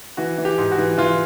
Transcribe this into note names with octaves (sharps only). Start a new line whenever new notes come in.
E3 F#4
E3
G4
G#2
F#4
E3
E3 F4